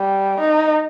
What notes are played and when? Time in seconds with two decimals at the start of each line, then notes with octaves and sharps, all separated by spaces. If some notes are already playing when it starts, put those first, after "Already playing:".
Already playing: G3
0.40 D#4